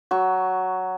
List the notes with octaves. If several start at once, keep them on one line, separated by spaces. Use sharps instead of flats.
F#3 C#6